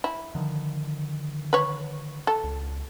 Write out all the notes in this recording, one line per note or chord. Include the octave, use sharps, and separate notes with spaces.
E4
D3 D#3 F3
B4 C#5
A4
C#2